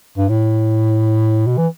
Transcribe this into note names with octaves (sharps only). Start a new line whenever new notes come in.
G2
A2
B2
E3